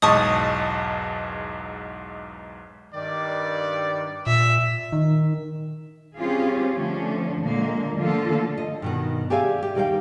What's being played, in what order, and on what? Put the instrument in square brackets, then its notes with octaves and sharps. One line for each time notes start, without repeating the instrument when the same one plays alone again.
[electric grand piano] B1 E2 G#2 [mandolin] D#5 A5 [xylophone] C#6 D#6
[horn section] G2 D#3 D5
[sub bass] A#2 [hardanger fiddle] E5
[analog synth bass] D#3
[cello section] G3 C4 C#4 F4 G4 G#4
D3 F3 A3 C#4 D4
A#2 D3 G#3 A#3
D3 F3 A3 A#3 F4 A4
[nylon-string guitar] D#5
G2 B2 D#3
G4 G#4 D5 E5 F5 G#5
G4
D#2 G3 A#3 D5 F5 G5